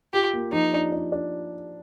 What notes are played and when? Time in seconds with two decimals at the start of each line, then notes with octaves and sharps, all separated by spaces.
0.13 F4 G4
0.34 A#3
0.53 F3 D#4
0.73 D4
0.92 D4
1.12 D4